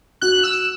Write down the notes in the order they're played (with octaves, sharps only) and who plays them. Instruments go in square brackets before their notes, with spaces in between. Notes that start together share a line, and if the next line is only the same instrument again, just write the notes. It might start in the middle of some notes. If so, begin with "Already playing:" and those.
[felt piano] F#4 [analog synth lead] F#6
[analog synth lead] E6